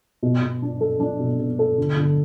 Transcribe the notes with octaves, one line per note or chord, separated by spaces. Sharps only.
B2
B2
D4
A4
D4
B2
B2
A4
D3
D3